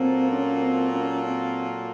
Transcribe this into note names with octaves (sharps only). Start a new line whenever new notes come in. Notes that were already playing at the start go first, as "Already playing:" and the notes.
Already playing: A#2 F#3 A#3 C4 F4 A4
C#4
C4
C#4
C4